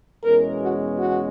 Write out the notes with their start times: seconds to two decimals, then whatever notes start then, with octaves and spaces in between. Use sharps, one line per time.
0.24 E2 B2 G#3 C#4 A#4
0.60 F#4
0.97 F#4